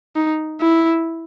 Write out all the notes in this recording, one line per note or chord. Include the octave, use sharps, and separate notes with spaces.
D#4
E4